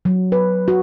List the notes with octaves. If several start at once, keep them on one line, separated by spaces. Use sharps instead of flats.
F#3
B4
F#4